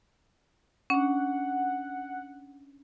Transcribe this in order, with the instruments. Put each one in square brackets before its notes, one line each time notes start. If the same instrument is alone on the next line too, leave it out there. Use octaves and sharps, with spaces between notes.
[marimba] C#4 D4 [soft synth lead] F#5